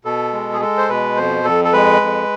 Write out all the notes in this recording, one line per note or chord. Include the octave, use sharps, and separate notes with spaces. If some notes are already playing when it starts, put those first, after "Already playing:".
B2 A4
G#3
G#4
G#3 A4
C5
B2 B4
F2 C5
F2 A4
A4
G#3 B4
F2